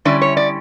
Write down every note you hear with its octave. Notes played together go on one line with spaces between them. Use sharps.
D3 G3 C#4 E4 D5
C#5
D5